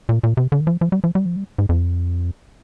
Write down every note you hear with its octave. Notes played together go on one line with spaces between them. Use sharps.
A#2
A#2
C3
D3
D#3
F3
F3
G3
F3
G3
F3
G3
G#2
F2